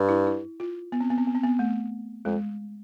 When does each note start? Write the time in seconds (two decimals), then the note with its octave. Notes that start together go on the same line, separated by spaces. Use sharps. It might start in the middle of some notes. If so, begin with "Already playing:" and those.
Already playing: G2
0.09 E4
0.26 E4
0.60 F4
0.92 B3
1.00 C4
1.10 B3
1.18 C4
1.27 B3
1.35 C4
1.44 B3
1.59 A3
2.25 F2 G#3